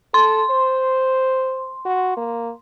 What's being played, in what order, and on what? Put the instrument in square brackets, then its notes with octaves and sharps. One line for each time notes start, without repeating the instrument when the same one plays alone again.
[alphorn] A4 [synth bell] C6
[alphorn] C5
F#4
A#3